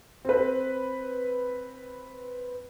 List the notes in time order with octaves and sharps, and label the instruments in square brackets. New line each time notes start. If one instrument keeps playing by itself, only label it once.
[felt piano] C4 B4